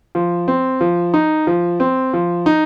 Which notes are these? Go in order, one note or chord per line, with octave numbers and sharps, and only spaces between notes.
F3
C4
F3
D#4
F3
C4
F3
D#4